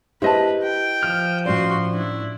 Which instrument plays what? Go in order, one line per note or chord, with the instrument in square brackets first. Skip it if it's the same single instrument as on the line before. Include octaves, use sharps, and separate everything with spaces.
[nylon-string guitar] E4 G4 [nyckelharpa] B4 [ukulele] C5 D#5 A5
[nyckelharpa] G5
[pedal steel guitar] F3 F6
[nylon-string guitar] A2 C#4 D5 [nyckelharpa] F#4 C6
[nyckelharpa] D4 E4